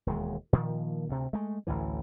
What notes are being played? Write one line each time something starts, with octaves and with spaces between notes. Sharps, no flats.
E1 D#2 G#3
A#2 D#3 F3
D2 C3
G#3 A3
A1 D2 A2 E3